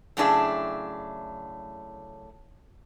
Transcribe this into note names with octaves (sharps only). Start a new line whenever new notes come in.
F#2 A2 C#3 D4 G#4 E5